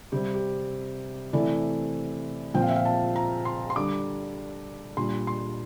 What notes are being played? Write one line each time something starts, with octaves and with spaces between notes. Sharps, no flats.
C3 G3 C4 G4
G4
C3 E3 A3 E4 D5
A#2 F3 C4 G5
F5
E5
F5
A5
A#5
C6
C6
D3 G3 D4 D6
A#2 G3 D4 C6
C6